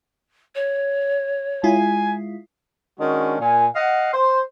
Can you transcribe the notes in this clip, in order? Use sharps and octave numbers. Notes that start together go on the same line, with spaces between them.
C#5
G#3 E4 F4 G#5
D#3 G#3 C#4 D4 F#4
A#2 G#5
D#5 F5 F#5
C5